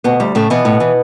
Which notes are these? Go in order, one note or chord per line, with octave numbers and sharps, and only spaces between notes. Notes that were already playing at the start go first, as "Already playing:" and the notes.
D2 B2 B3
D2 G3
A2 C#3 A3
B2 E3 B3
A2
E3